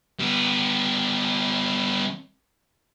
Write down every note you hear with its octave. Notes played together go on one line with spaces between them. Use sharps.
G3 B3